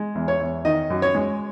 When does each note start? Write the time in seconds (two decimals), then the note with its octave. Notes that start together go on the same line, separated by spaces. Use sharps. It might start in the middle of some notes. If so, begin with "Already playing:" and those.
Already playing: G#3
0.15 E2
0.28 C#5
0.41 E2
0.65 D#3 D#5
0.90 F#2
1.02 C#5
1.15 G#3